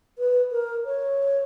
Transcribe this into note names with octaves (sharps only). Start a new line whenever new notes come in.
B4
A#4
C#5